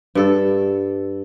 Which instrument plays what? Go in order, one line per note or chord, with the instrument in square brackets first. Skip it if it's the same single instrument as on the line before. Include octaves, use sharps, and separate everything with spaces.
[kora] G2 A4